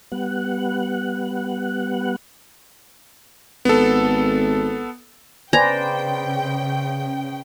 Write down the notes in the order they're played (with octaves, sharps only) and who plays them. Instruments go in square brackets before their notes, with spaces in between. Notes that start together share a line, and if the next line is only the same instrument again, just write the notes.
[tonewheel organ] G3 B3 F#5
[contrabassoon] G#1 [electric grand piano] B3 A4
[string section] C#3 G5 [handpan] B4 C5 D5 [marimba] G#5 G#6 [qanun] A#5